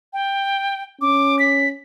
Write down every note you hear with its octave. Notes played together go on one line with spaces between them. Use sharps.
G5
C#4 D6
B6